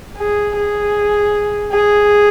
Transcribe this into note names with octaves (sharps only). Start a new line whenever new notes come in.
G#4
G#4
G#4